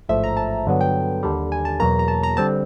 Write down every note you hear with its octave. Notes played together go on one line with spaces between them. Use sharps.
A1 G#2 F3 A3 E5
A#5
A5
G2 D3 F#3 B3
G5
D#2 D3 G3
G#5
A5
E2 B2 F#3 A#3 A#5
A#5
A5
A#5
D3 G3 C4 A5